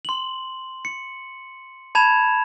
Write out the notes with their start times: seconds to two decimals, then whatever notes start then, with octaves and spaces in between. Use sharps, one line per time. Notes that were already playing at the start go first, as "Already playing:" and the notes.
0.05 C6 F#7
0.85 C#7
1.95 A5 B5 G#6 E7 F7